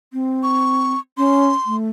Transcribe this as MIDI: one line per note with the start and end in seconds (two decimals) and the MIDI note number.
0.13 0.93 60
0.43 0.99 85
1.18 1.48 61
1.18 1.76 84
1.66 1.90 57